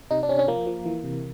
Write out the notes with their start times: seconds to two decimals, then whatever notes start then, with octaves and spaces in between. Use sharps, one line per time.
0.11 C3 D#4
0.23 D4
0.29 C3 C#4
0.39 C#4
0.48 F3 A#3
0.67 F3
0.85 E3
1.04 C3